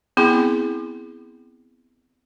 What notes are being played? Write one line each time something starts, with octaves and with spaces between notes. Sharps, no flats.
B3 C4 E4 G#4 C6